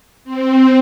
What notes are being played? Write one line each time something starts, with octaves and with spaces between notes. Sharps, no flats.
C4